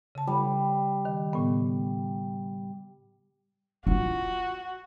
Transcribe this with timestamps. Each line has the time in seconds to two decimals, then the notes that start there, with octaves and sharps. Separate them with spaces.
0.15 C#3 A5
0.27 G3
1.05 D#3
1.33 A2 C#3 B3
3.87 D#4 F4 F#4